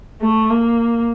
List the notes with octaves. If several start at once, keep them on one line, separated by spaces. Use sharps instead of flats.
A3
A#3